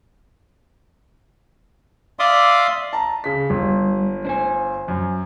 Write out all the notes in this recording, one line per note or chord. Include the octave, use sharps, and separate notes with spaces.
D5 E5 F5 C6 D6 D#6
A5 A#5
C#3 B6
G1 G3
D4 C5 G#5
F#2